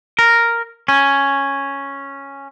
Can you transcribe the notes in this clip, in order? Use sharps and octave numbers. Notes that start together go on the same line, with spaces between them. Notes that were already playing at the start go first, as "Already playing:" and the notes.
A#4
C#4